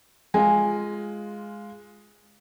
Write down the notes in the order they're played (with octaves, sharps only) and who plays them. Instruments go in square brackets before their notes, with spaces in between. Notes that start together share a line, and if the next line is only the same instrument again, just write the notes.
[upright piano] G#3 F4 [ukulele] G#5